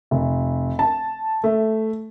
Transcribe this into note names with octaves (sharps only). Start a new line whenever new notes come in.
F1
A5
A3